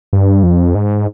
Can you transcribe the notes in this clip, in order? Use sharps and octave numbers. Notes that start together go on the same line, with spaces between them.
G2
F2
G#2